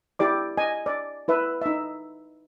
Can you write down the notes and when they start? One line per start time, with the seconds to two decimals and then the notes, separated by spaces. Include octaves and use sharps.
0.19 E4 G4 D5 D6
0.58 D#5 G#5
0.86 D5
1.28 E4 B4 E5
1.61 D#4 E5